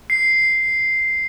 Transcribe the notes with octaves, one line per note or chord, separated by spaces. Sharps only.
C7